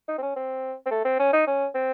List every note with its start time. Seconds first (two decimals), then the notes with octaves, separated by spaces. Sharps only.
0.09 D#4
0.18 C4
0.22 C#4
0.36 C4
0.86 C4
0.91 A3
1.05 C4
1.19 C#4
1.33 D#4
1.47 C#4
1.75 C4